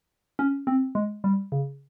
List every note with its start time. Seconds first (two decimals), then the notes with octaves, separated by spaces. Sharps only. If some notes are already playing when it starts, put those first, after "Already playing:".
0.39 C#4
0.67 C4
0.95 G#3
1.24 G3
1.52 C#3